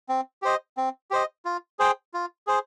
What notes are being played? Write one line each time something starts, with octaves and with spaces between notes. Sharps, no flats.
C4
G4 C5 D#5
C4
G4 C5 D#5
F4
G#4 C5 G5
F4
G#4 C5